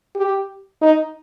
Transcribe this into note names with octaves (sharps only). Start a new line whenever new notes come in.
G4
D#4